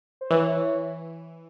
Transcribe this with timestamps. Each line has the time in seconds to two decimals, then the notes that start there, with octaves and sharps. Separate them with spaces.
0.21 C5
0.30 E3 C#5